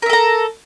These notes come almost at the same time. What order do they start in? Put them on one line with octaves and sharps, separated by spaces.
A#4 E5 A4 A#5